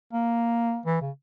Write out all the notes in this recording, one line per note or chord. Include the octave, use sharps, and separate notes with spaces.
A#3
E3
C#3